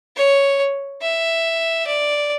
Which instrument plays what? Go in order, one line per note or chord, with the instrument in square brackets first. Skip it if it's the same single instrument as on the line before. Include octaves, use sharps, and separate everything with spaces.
[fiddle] C#5
E5
D5